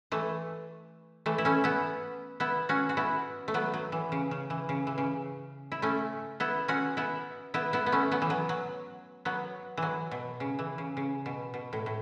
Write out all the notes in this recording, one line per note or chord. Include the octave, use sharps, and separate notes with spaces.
E3 A3
E3 A3
E4
A3 C#4
B3 E4
B3 E4
C#4 F#4
F#4
B3 E4
A3
F#3 B3
F#3
E3
C#3
C#3
E3
C#3
E3
C#3
E4
A3 C#4
B3 E4
C#4 F#4
B3 E4
B3 E4
B3 E4
B3
A3 C#4
F#3 B3
E3
F#3
F#3
F#3 B3
E3 F#3
B2
C#3
E3
C#3
C#3
B2
B2
A2
A2